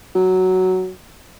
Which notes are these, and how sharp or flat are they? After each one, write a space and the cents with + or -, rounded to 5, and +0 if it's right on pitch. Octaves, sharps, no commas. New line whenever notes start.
F#3 +5